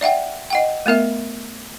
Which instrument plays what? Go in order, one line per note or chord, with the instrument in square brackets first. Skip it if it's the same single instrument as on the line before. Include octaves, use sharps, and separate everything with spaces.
[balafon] D5 E5 F#5 G5
D#5 F#5 G5
A3 B3 A#4 E5